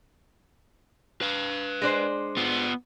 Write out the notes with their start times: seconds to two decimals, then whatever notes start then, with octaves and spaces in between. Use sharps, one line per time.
1.21 B4 F5
1.82 G#3 D4 C5
2.37 B3 F4